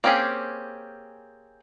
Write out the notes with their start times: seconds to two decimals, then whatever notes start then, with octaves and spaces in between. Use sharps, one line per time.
0.04 A#3 C4 C#4 G4 G#4